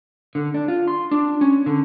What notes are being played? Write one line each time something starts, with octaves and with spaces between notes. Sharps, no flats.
D3
D4
F4
C6
D4
C#4
D3